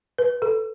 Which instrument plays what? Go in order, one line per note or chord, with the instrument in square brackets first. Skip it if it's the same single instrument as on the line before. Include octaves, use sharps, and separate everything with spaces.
[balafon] B4
A4